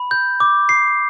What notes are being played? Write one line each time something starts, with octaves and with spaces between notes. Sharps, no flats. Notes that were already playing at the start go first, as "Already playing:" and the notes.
Already playing: B5
G6
D6
C7